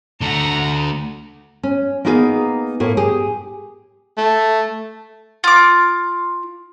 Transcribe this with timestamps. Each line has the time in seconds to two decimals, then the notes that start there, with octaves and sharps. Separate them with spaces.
0.21 D3 A3 F#5 A#5
1.63 C#4
2.05 A#3 B3 D#4 E4 G#4 F5
2.80 A2 A3 A#3
2.97 G4 G#4
4.17 A3
5.44 F4 D6